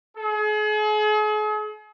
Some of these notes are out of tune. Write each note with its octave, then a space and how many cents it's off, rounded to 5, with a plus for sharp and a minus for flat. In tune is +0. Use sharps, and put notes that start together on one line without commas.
G#4 +40